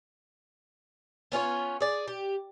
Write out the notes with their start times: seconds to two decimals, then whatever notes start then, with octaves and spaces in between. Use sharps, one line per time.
1.32 B3 C#4 F4 C#5
1.80 G#4 D5
2.08 G4